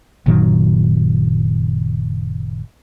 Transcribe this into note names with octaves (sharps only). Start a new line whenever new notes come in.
F#1 A#2 D#3 F#3